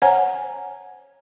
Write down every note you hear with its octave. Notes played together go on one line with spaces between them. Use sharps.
C5 C#5 F#5 G#5 A#5